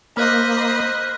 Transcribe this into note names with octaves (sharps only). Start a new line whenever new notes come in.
A#3 C5 D#5 B5 F6 F#6